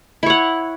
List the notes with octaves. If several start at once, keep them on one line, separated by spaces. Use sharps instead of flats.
E4 C#5 F#5